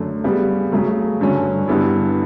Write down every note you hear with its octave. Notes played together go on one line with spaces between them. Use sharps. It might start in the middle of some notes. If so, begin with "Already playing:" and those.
Already playing: F#2 D3 A3
C#3 G3 B3
C#3 F#3 A3
G2 D3 F#3 C#4
G2 D3 G3 B3 E4